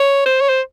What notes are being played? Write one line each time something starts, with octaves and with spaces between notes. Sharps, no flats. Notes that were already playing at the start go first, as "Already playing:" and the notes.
Already playing: C#5
C5
C#5
C5